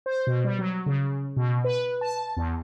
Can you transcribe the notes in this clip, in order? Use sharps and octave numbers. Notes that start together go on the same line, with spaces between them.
C5
B2
G3
F#3
C#3
B2
B4
A5
E2